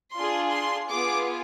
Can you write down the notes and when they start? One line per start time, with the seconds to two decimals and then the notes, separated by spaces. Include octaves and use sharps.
0.15 D4 F4 G#4 C6
0.52 C6
0.89 B3 F4 G#4 D6